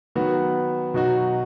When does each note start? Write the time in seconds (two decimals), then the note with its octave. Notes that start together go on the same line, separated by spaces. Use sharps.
0.15 D#3 F#3 B3 F#4
0.94 B2 F#3 D#4 F#4